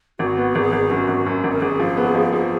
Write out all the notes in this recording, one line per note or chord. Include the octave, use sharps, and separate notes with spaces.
G#1 F#4
B3
G#1 G#4
G#1
F#2 F#4
G#1
F#2
G#1
A#4
G#1 G#4
F3
B3
F3
F3 G#4